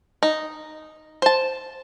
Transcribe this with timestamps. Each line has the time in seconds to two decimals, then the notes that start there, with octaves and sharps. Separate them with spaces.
0.23 D#4
1.22 C5 A5